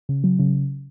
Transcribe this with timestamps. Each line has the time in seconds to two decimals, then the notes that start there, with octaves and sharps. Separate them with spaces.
0.09 C#3
0.24 F#3
0.39 C#3